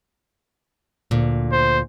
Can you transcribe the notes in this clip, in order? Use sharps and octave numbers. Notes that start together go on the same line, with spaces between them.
D2 A#2
C5